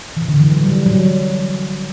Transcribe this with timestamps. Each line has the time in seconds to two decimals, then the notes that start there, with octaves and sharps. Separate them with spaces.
0.17 E3
0.28 D3
0.40 E3
0.52 F#3
0.63 G3
0.86 F#3